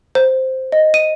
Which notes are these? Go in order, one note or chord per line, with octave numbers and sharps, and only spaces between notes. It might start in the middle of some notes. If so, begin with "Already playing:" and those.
C5
D#5
D#7